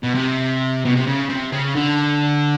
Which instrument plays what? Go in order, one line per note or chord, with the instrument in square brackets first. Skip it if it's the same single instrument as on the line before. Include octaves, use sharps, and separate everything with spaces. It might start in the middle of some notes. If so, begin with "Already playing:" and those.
[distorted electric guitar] B2
C3
B2
C3
C#3
C3
C#3
D3